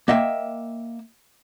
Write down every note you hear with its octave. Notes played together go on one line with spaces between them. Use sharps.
A#3 D#5 E5 G5